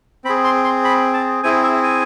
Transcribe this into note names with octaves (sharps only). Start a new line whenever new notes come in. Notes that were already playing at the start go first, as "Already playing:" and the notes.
C4 B5
G#4
C6
C6
B5
A5
C4 E4 G#4 G#5
E5
G#5